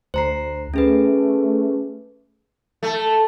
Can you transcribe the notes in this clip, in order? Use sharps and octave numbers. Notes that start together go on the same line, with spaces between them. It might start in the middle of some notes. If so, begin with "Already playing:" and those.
D2 C5 A#5 C7
A3 C#4 G#4 B4
A3